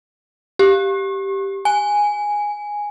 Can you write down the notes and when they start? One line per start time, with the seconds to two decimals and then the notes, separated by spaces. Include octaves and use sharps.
0.59 G4
1.65 G#5